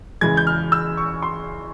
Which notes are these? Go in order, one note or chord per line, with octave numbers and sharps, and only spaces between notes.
E2 C#3 E3 G#3 G#6
G6
F6
E6
C#6
C6